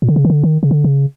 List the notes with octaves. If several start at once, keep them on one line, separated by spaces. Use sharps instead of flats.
A#2
D3
C#3
D#3
D3
D#3
C#3
D3
C#3